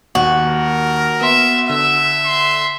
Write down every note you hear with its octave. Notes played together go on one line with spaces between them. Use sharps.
D#2 F#4
A#4
B3 E5 C6
D3 E5 E6
C6